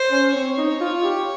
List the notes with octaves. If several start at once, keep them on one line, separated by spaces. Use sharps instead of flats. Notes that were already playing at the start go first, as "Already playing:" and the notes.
Already playing: C5
C#4
C4 C#5
D#4
F4
G4